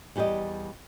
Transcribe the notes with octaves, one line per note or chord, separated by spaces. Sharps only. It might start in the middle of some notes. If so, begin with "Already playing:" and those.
E2 G3 G4 D5 D#5